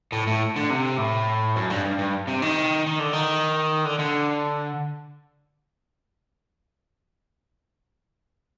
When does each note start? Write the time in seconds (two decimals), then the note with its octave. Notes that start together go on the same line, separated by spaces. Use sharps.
0.12 A2
0.27 A2
0.56 D3
0.70 C3
0.98 A2
1.56 F#2
1.70 G2
1.85 G2
1.98 G2
2.27 C3
2.42 D#3
2.86 D#3
2.99 D3
3.13 D#3
3.85 D3
3.99 D3